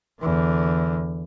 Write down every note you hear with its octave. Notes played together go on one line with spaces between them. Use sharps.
E2 D3